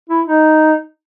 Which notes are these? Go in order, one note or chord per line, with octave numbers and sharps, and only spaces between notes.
E4
D#4